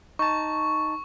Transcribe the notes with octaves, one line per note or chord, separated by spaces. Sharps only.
D#4 A5 C#6